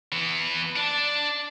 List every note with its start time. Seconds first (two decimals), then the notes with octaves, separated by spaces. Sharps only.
0.12 E3 B3
0.76 D4